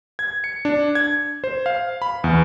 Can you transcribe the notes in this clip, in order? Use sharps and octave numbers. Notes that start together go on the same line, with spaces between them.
G#6
C#7
D4
G#6
C5
F5
B5
E2